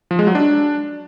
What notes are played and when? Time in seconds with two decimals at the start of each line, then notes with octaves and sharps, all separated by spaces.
0.11 F3
0.19 G#3
0.27 F#3
0.35 D4